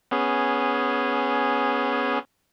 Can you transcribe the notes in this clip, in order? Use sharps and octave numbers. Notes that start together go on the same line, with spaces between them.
B3 C#4 G#4